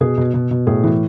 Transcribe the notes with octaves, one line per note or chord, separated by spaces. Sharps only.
B2 G#4
B2
B2
B2
A2 G#4
E3